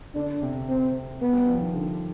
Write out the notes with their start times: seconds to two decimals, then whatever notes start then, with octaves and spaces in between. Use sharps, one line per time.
0.15 D3 D4
0.42 C3
0.69 C4
1.21 B3
1.33 G3
1.47 F3
1.60 D#3
1.74 D3